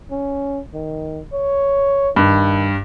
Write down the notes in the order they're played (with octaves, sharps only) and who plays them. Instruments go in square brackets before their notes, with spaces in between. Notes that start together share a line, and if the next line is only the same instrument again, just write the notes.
[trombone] C#4
D#3
C#5
[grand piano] G2 [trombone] D#3